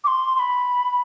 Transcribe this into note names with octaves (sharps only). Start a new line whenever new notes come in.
D6
C6
C6
B5